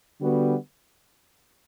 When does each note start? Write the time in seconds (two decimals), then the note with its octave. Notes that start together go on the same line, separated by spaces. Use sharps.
0.20 D3 G3 B3 F#4